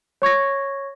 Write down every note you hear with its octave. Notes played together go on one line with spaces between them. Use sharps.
C#5 C#6 G#6 A#6